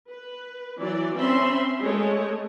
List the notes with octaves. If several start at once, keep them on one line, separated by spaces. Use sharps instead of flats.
B4
E3 F#3 D5
C4 C#4 E5 B5 C6
G#3 A3 C#5